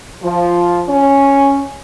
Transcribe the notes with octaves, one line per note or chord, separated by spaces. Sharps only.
F3
C#4